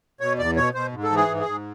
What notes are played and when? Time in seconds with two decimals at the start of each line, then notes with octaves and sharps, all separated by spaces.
0.20 B2 C#5
0.38 E2 D5
0.56 B2 C#5
0.74 B2 C5
0.92 G#2
1.04 A4
1.11 E3
1.16 G#4
1.28 G#2
1.40 G#4
1.46 G#2